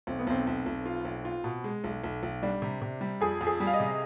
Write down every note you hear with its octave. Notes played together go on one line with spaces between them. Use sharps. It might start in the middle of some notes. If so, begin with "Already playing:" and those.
B1 C4
B3
B1 C4
B1
B1
F4
B1
F4
B2
G#3
B1
B1
B1
G3 D4
C3
C3
G3
F2 G#4
F2
G#4
G3
F5
D#5
C3